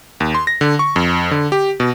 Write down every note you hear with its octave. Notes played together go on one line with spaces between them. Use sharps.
D#2
C6
A#6
D3
C#6
F2
D3
G4
B2